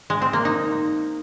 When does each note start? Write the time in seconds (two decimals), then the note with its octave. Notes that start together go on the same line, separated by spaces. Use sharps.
0.10 G#3
0.22 C4
0.33 A#3
0.45 D#4